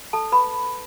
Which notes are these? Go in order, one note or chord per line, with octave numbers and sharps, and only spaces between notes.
A4 A5
B4 B5